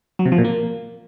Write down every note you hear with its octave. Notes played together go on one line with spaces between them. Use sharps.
F#3
C3
F3
A#2
A#3